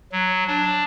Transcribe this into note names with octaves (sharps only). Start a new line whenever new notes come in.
F#3
D4